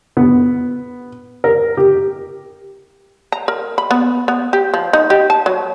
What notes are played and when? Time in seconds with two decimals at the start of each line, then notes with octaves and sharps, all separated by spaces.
0.17 B3
1.44 A#4
1.77 G4
3.32 A#5
3.48 A#4
3.78 B5
3.91 B3
4.28 B3
4.53 G4
4.74 F3
4.93 D#4
5.10 G4
5.30 A5
5.46 F#3